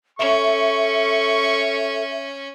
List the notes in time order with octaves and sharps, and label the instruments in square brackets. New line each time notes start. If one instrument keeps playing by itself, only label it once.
[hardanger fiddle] C#4 [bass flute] A4 [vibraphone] E5 [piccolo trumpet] C#6